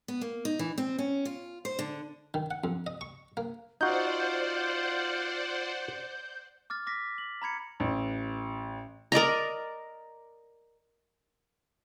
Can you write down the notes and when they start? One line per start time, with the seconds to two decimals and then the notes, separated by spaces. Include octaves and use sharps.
0.08 B3
0.21 A#3
0.45 D#4
0.59 E3
0.78 C4
0.99 C#4
1.25 F4
1.65 C5
1.79 D3
2.34 D#3
2.51 F#5
2.64 F2
2.87 D#5
3.01 C#6
3.37 A#3
3.81 D#4 F4 F#4 C5 D5 F#5 G6
6.70 D6 F6 A6
6.87 D6 A#6 B6
7.18 F#7
7.42 A#5 B5 G#6 C#7
7.80 A1
9.12 A#4 D5 D#5 A#5